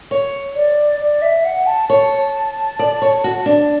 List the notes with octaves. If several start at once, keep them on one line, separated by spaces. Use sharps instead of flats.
C#5
D5
D5
E5
F#5
A5
C#5 A5
D5
C#5
F#4
D4